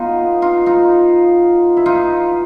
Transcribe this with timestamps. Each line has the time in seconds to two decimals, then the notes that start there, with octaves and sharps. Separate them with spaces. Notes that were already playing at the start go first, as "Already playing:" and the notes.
Already playing: B3 D#4 F4
0.42 D#4 F4
0.66 D#4 F4
1.77 E4
1.86 D#4 F4